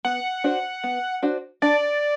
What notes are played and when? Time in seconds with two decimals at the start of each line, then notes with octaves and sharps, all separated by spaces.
0.05 B3 F#5
0.44 D4 F#4 C5
0.84 B3
1.23 D4 F#4 C5
1.62 D4 D5